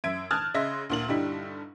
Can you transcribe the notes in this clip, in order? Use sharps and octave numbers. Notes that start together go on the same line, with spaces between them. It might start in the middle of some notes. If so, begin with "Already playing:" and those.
F#2 E5 G#6 D7
A5 D#6 F6 F#6 G#6 A6
C#3 D#5 E5 C6 A#6
D2 A#2 F#7
G2 D3 G3 D#4 E4